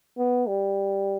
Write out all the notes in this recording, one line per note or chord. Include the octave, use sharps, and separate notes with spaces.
B3
G3